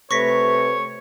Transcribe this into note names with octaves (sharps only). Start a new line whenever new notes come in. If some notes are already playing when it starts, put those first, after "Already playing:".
C3 A3 B4 C#5 C#6 A#6 B6